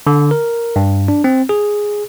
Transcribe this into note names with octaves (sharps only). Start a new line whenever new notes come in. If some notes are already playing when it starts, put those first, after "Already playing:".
D3
A#4
G2
D4
C4
G#4